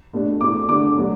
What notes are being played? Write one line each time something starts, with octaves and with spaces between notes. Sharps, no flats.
B2 A3 D4
B2 A3 C4 E4 D6
D3 A3 D4 D6
B2 F#3 A3 D4